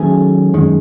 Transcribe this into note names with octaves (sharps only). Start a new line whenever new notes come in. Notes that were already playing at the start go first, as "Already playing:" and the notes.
Already playing: D#3 F#3 A3 C#4 G#4
F#2 D#3 G#3 C#4